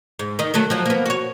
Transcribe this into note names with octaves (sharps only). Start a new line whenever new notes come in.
G#2
D#3 D#4
D#3 F#3 A3
F3 F#3
A#3 B3
F#4 C#5